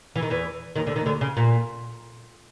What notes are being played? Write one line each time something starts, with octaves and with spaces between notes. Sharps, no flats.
E3
D#3
E2 E3
D#2 D#3
D2 D3
D#2 D#3
D2 D3
C#3
A#2